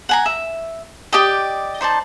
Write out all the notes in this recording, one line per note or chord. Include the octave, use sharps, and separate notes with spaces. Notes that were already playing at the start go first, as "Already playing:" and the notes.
F#5 G#5 A#5
E5
G4 D5 D#5 G5
D#4 C5 D5 A5